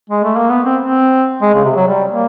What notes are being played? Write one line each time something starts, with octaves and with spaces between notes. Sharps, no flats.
G#3
A3
A#3
B3
C4
C4
G#3
C#3
C3
F#3
G3
A#3